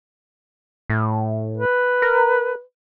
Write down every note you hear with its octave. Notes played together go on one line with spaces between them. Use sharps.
A2
B4
A#4